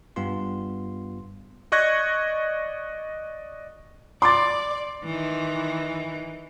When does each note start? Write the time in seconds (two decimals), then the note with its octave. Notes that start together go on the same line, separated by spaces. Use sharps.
0.16 G2 G3 B3 F4 C6
1.72 D5 D#5 C#6 F#6 G#6 A#6
4.22 D5 C6 D6 A6
5.04 D#3 E3